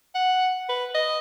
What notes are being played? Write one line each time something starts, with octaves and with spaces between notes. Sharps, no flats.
F#5
B4
D#5